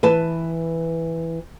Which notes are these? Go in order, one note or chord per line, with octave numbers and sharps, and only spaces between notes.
E3 B4 A5